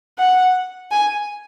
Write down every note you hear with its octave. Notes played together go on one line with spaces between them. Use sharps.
F#5
G#5